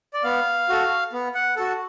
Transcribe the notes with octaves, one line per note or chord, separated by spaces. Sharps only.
D5
B3 F5
F#4 A4
B3
F#5
F#4 A4